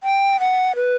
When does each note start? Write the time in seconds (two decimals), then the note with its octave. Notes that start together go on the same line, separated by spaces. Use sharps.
0.03 G5
0.40 F#5
0.76 B4